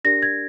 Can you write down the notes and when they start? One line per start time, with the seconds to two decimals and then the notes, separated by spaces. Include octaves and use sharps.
0.04 D4 G4 A#4 D5 A#6
0.22 G#6